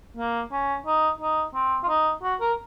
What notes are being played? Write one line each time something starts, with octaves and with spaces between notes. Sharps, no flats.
A#3
C#4
D#4
D#4
C4
F4
D#4
F#4
A#4